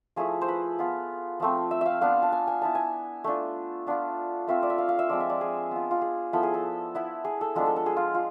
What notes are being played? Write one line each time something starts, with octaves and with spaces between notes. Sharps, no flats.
F3 A3 E4 G#4
C5
B4
B3 F4
F3 A3 C4
E5
E5 F5
B3 D4 F4 F5
A5
G#5
G#5
B3 E4 A5
G#5
A3 D4 F4
B3 D4 F4
A3 C4 F4 E5
D5
E5
F5
F5
E5
F3 G#3 C4 D5
E5
D5
G#4
B3 F4
F4
G#4
F3 B3 E4 A4
G#4
A4
B3 E4
G#4
A4
F3 G#3 B3 D4 A4
A4
A4
G#4
F4
F4